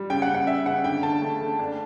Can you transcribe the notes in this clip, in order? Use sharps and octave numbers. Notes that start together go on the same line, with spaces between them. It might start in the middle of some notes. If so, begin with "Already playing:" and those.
Already playing: G3
C#3 G5
F#5
C#3
F#5
C#3 E5
C#3 F#5
D3 G5
D3 A5
A3
A3
D4